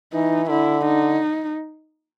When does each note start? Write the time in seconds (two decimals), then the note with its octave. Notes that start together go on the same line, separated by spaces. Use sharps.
0.13 E3 D#4
0.49 D3 E4
0.85 D#4